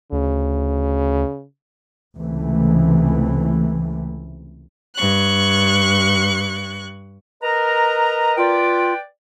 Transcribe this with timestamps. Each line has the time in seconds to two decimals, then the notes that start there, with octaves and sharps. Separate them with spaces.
0.12 D2 C#3
2.17 C#2 C3 E3 A3
4.95 G2 C#6 F#6
7.43 A#4 B4 D#5 A#5
8.37 F4 B4 D5 G5